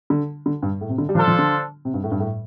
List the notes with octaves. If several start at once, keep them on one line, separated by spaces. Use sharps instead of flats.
D3
D3
G2
A2
C3
D3
G3
F3 D4 F4 A4 C5
F3
D3
C3
G2
A2
G2
A2